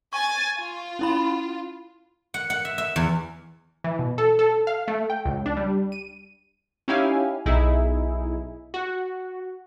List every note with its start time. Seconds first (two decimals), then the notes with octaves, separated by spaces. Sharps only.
0.13 G#5 C#6 A6
0.60 F4
0.99 C#4 E4 B5
2.34 F#5
2.50 F#5
2.65 E5
2.78 E5
2.96 E2
3.84 E3
3.99 B2
4.18 A4
4.39 A4
4.67 F5
4.88 A3
5.10 G5
5.26 C#2
5.46 D4
5.57 G3
5.92 D#7
6.88 C#4 D#4 E4 G4 F5 G#5
7.46 B1 D#4 E4 G#4
8.74 F#4